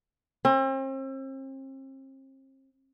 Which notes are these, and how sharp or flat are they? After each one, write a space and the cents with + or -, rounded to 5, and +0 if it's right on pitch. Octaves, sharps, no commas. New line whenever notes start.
C4 +40